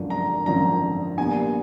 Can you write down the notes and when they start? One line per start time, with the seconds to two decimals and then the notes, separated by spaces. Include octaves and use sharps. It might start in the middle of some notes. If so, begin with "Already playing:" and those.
Already playing: G#1 F#2 D3 F3
0.10 A#5
0.46 G#1 F#2 D3 F3 A#5
1.18 A#1 A#2 G3 B3 D4 G#5